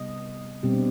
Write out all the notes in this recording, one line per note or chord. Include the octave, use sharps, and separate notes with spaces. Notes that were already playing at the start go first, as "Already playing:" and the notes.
Already playing: C3 G3 B3 D#5
B2 G3 C4 G4
D4